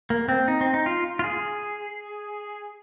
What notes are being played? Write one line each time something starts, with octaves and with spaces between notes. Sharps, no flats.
A#3
C4
D#4
C4
D#4
F4
F4
G#4